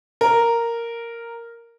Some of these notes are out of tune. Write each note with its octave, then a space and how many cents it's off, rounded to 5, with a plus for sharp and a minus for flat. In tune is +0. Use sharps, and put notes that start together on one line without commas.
A#4 -5